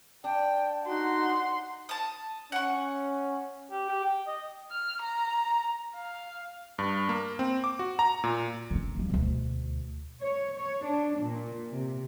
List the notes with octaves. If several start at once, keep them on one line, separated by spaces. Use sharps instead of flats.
D4 G5
D#4 F#4 F#5 C6
A5 D#6
C#4 F#5 C#6
G4
G4
G5
D#5
F6
A#5
F5
G2
A#3
C4
D6
F#4
A#5
A#2
D3 C#4
D#2 G3
D2 B2
C#5
C#5
D4
A#2
C3